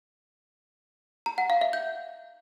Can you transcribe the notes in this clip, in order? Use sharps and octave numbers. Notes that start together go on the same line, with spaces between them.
A#5
F#5
F5
E5
G6